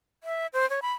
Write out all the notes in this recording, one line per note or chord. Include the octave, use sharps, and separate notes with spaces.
E5
C5
C#5
B5